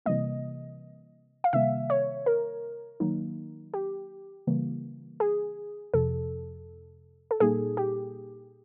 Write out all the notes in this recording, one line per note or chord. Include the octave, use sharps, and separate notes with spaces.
C3 E3 G3 A#3 D#5
F5
C3 D#3 G3 A#3 E5
C#5
A#4
D#3 F#3 A#3 D#4
G4
C#3 E3 G3 A#3
G#4
F2 C3 F3 A4
A4
A#2 G3 A#3 D#4 G#4
G4